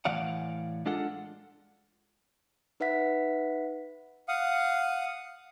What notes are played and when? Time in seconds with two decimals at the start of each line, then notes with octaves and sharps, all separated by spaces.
0.05 A2 E3 D5 F5 F#5
0.86 G#3 D4 F4 A4 F#5
2.80 D#4 B4 E5 F#5 B6
4.28 F5 F#5 D#6